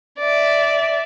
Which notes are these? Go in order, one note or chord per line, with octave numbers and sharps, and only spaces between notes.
D5 E5